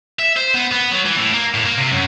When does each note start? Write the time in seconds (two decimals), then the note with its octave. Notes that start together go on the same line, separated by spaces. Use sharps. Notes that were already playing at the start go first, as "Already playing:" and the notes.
0.19 E5
0.37 C5
0.54 B3
0.71 B3
0.91 F#3
1.05 E3
1.17 A2
1.33 A#3
1.54 A2
1.66 A#3
1.77 C3
1.91 F#2